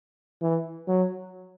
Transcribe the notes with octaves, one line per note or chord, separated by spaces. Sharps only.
E3
F#3